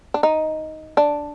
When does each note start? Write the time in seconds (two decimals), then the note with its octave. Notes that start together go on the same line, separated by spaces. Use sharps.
0.14 D4
0.23 D#4
0.97 D4